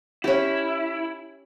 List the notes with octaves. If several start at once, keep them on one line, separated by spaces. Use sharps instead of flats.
C#4 E4 G4